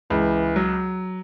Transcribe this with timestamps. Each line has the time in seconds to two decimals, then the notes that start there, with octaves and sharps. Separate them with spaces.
0.10 C#2 E3
0.56 F#3